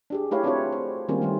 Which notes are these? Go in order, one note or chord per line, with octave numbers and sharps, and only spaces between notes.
D4 G4 G#4
A3 E4 G4 B4 C#5 F5
C4 D4 F4 F#4 B4 C#5
C5
D#3 G3 A#3 C4 C#4 F4
D#3 G3 A3